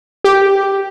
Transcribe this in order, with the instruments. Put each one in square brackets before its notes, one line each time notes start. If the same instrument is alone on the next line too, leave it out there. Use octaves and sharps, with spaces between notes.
[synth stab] G4